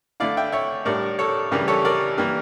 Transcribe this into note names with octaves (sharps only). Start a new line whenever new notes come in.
D3 A3 E4 D5 F5
E5 G5
C#5 E5
A2 G3 D4 A#4 D5
A4 C#5
C#3 E3 G3 D4 G4 A#4
A4 C#5
A#4 D5
E3 A#3 D4 G4 A#4